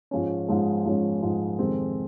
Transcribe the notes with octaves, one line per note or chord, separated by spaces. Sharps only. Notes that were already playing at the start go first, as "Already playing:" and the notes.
G#2 F3 G#3 C#4
G#2 F3 G#3 C#4
G#2 F3 G#3 C#4
G#2 F3 G#3 C#4
F2 C3 D#3 G#3 C4